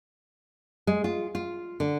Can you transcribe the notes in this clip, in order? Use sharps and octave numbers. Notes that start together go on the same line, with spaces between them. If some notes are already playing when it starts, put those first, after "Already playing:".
G#3
F4
F4
D3